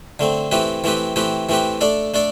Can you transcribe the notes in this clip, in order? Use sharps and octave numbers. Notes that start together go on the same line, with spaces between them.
D3 A3 C4
E3 A3 C4 G4 B4
E3 A3 C4 G4 B4
E3 A3 C4 G4 B4
E3 A3 C4 G4 B4
A3 D4 A4 D5
A3 D4 A4 D5